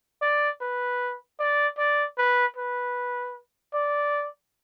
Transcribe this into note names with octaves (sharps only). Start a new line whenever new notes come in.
D5
B4
D5
D5
B4
B4
D5